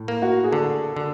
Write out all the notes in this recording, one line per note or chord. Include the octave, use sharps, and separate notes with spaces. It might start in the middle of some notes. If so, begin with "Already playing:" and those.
Already playing: A2
A#3
F#4
G#4
D3 A4
D3